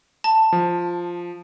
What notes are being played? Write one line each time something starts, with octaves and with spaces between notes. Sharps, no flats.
A5
F3